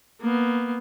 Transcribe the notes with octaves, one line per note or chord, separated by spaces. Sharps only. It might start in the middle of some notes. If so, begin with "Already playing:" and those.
A#3 B3